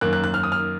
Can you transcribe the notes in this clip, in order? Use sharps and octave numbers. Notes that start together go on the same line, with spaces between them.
F#2 D#3 A#3 F#6
F#6
F#6
F6
D#6
F6